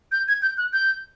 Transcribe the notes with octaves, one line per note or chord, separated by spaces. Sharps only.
G6
G#6
G6
F#6
G6